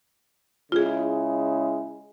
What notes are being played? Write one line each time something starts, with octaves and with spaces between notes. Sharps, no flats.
C#3 G#3 E4 F4 G#4